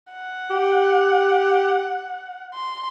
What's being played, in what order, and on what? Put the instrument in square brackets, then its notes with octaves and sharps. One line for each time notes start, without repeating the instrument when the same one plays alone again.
[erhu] F#5
[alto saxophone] G4
[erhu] C6